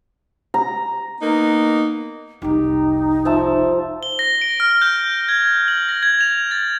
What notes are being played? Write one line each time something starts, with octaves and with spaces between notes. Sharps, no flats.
A#5
A#3 B3 D#4
F1 C2 D#4 G4
F3 E5 A5
G7
A#6
D7
F6
G6
G#6
F#7
A#6
G#6
F7
A6